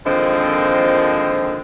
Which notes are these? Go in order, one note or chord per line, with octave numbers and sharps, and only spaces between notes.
A#2 D3 D#3 F3 G#3 C4